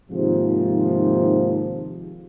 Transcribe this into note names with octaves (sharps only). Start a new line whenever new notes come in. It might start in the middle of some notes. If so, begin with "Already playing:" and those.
D#2 G#2 C3 F3